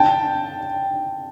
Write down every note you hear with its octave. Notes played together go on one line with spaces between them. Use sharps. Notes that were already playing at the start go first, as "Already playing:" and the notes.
Already playing: G5 A5